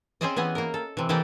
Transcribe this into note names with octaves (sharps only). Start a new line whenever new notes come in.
C4 C#4 G#4 C5 D5 D#5
E3 B3 G#4 D#5
A#3 A#4
A4
C3 E3
E3 A#3 G4 A4 D5 D#5